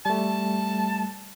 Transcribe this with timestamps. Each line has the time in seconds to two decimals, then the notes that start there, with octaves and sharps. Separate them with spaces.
0.06 G3 A3 A5